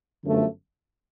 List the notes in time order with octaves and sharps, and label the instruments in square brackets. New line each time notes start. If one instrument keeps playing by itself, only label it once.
[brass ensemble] G1 F#2 D3 F3 A3